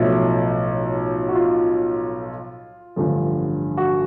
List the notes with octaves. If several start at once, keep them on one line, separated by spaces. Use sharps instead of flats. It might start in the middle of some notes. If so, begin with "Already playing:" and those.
Already playing: B1 A2 F3 E4
F#4
F4
A1 G2 D3 F3
F#4